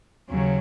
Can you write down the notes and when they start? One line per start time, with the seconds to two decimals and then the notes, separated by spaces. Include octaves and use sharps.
0.29 D#2 C#3 F#3